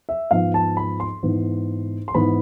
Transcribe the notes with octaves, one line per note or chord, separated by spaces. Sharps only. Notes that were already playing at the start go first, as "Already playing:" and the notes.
E5
G#2 F3 B3 F5
A5
B5
C6
G#2 E3 B3
C6
G#2 E3 B3 B5